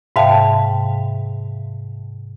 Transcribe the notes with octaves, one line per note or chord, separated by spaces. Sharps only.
G#2 C3 E5 F5 G5 A5